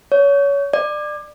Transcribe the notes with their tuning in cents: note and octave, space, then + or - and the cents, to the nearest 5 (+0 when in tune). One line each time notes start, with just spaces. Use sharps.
C#5 +25
D5 +25